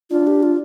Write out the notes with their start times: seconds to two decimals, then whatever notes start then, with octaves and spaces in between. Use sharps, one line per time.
0.10 D4 F4
0.27 G4
0.43 F4